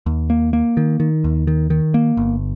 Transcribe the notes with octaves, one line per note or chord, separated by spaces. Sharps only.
D#2
A#3
A#3
D#3
D#3
D#2
D#3
D#3
A#3
G1